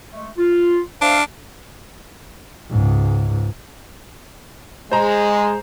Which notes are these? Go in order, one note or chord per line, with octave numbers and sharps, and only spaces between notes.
G#3 A3
F4
D4 C5 E5 F5
C#2 G#2
G#3 C5 A#5